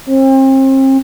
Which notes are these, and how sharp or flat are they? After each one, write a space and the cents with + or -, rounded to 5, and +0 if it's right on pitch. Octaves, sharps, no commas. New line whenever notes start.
C4 +35